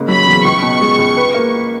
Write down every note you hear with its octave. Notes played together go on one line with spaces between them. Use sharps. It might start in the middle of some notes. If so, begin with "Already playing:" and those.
Already playing: G#2 C#3 A#3
F#3 B5
E2
C#2 C#6
B2
G#3
C#2
B4
A#3